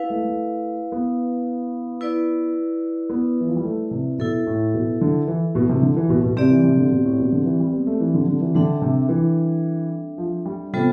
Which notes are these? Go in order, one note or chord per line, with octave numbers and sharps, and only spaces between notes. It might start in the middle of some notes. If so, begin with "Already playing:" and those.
Already playing: E4 B4 F5
A3
A3
B3
E4 B4 D5
B3
E3
F3
G3
A3
C3
B2 E4 A4 E5
A2
B2
D3
E3
B2
C3
D3
E3
B2
B2
C3 C4 G4 D5
E3
C3
D3
B2
A2
B2
D3
E3
G3
B3
A3
E3
D3
D3
E3
D3 G3 D4 A4 E5
C3
E3
F3
G3
C3 G3 B3 F4 A4 C5